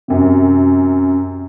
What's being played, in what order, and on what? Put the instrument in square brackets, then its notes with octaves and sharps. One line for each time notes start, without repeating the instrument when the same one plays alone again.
[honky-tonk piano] F#2 C3